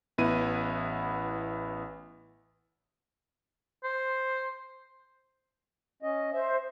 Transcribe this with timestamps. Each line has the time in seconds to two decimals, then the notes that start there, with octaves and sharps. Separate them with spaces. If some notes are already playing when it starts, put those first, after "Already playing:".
0.18 A1 B3 E4 D#7
3.84 C5
6.02 C#4 D#5
6.33 C5 E5